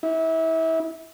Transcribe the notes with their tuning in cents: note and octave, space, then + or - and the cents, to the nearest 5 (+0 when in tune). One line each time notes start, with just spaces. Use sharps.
E4 -30